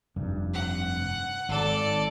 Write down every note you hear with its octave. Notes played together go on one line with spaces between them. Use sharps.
F1 G2
F#5
G#1 A4 D5